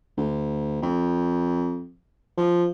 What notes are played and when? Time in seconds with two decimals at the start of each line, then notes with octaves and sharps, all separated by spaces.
0.17 D2
0.82 F2
2.37 F3